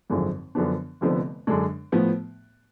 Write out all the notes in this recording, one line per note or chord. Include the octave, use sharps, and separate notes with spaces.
G#1 F#2 D3 F3 G#3
F#2 D3 F3 B3 D4
F1 F2 D3 F3 B3
F#2 D3 G#3 D4
A2 F3 B3